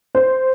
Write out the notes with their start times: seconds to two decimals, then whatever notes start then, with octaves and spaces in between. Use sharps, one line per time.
0.15 C5